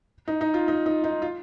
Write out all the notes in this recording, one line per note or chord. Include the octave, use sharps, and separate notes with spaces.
D#4
D#4
F4
D#4
D#4
D#4
F4